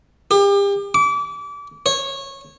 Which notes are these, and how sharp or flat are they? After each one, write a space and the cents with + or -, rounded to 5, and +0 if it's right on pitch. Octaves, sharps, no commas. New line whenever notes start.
G4 +35
D6 -30
C#5 -20